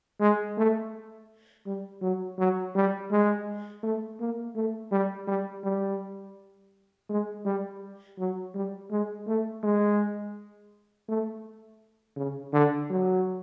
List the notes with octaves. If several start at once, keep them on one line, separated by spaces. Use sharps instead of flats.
G#3
A3
G3
F#3
F#3
G3
G#3
A3
A#3
A3
G3
G3
G3
G#3
G3
F#3
G3
G#3
A3
G#3
A3
C#3
D3
F#3